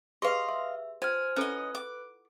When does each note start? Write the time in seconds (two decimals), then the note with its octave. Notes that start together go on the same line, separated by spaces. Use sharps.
0.22 G4 G#4 B4 D#5 F5 C6
0.49 E5 C6
1.02 F4 C5 G#5 F6
1.36 C#4 E4 A4 B4 D#5 F#5 F#6
1.75 D6